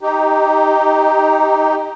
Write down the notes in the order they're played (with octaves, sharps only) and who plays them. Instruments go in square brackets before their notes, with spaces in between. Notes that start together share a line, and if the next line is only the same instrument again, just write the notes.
[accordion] D#4 G4